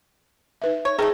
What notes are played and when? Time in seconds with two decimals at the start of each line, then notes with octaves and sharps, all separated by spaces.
0.62 D#4 B4 E5
0.85 C#5
0.99 A3 D#4 G#4 A#4 G5 A#5